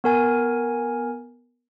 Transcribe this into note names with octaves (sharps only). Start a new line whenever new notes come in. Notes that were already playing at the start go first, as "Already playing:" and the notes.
B3 A#4 G#5